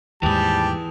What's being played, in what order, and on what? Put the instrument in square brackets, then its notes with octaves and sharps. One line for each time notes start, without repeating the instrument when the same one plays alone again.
[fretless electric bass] D#2 G#2 [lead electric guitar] E3 G#4 [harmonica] G3 G4 [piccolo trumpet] A5